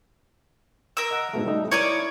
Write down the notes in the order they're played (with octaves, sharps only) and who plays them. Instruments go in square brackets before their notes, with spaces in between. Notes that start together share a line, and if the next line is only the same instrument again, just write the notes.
[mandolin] A#4 E6
[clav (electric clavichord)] D#5 F#5
G#2 B2 A3
G3 A3 D#4
[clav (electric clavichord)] E4 A#4 [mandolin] C#5 D5 D#6